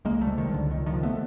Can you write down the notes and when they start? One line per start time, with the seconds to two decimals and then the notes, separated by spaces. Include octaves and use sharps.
0.05 C#2 G#3 A#3
0.21 G3 A3
0.27 C3
0.38 D#3
0.49 C#2 D3
0.71 C#2 D#3
0.86 D#3 F3
0.93 C3
1.03 A3 B3